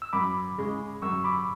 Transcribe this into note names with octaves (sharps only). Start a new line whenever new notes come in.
E6
F#2 B5 D6
C#3 G#3
F#2 C#6 E6
B5 D6